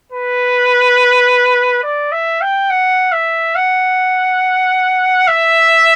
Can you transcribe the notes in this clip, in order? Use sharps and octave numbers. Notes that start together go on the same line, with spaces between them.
B4
D5
E5
G5
F#5
E5
F#5
E5